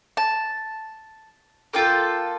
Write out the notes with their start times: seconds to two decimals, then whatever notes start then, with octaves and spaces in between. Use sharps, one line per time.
0.17 A5
1.73 A#3 F4 A4 G5